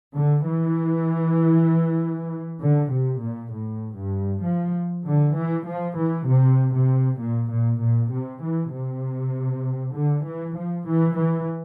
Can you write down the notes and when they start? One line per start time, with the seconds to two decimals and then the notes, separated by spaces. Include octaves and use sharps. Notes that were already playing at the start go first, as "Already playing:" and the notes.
0.15 D3
0.46 E3
2.60 D3
2.91 C3
3.21 A#2
3.52 A2
3.98 G2
4.43 F3
5.05 D3
5.36 E3
5.66 F3
5.97 E3
6.27 C3
6.74 C3
7.19 A#2
7.50 A#2
7.80 A#2
8.12 C3
8.42 E3
8.73 C3
9.94 D3
10.25 E3
10.56 F3
10.87 E3
11.17 E3